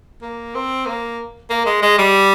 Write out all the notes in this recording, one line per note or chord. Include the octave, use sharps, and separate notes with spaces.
A#3
C4
A#3
A#3
G#3
G#3
G3